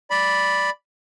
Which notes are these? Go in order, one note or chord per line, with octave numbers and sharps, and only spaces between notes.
D5 B5